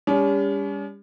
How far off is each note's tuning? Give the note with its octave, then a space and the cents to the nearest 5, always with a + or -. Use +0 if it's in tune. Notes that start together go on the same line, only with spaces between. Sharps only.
G3 +40 C#4 +40 G4 +45